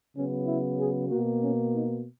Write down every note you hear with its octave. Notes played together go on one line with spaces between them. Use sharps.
C#3 F#3 B3 C#4
E4
G#4
B2 A#3 F#4
C#4
D#4